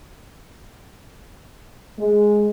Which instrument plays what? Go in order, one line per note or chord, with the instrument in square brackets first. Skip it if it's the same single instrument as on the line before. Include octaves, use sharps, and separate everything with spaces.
[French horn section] G#3